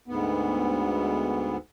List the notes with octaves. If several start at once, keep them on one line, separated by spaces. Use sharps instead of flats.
D2 G#2 B3